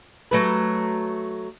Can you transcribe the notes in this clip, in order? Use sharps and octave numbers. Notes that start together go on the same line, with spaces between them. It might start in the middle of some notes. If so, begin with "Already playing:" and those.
F#3 A3 B4